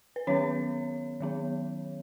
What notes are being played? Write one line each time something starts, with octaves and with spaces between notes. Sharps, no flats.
B4
D#3 F#3 B3 C#4 C#5
D#3 F#3 B3